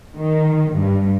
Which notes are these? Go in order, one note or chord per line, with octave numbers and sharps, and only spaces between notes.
D#3
G2